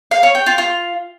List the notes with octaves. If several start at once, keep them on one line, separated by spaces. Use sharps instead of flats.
F5
C#5
G5
F4
F4